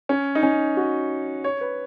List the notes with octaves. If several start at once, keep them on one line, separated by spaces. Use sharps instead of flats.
C#4
D#4
C#4
F#4
C#5
B4